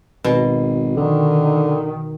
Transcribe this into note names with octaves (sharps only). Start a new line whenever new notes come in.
G#1 B2
D3 D#3